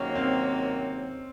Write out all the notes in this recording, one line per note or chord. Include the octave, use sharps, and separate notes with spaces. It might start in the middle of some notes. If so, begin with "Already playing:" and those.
Already playing: C3 D#3 F#3 A#3 C#4
C4